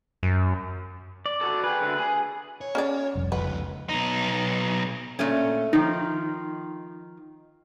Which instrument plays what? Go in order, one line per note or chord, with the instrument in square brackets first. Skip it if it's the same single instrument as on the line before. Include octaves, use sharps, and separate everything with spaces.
[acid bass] F#2
[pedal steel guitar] D5
[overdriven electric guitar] F#4 A4
[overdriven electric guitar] G#4 G5 [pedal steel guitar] B4
[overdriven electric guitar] D2 D3
G#4
[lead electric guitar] C#5
[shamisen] C#4 G#4 D5
[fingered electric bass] F1 C2
[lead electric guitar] C#3 F3 [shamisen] B4
[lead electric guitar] B1 D#4
[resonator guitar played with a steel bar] A#2 A3 C#4
[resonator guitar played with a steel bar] D#3 F3 [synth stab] D#4